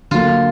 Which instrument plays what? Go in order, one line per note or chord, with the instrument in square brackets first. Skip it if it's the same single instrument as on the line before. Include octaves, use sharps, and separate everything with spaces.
[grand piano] D3 F#3 A#3 [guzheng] F4